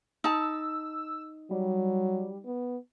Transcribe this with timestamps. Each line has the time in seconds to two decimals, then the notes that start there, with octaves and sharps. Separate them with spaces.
0.24 D#4 A5 E6
1.51 F#3 G3
2.45 B3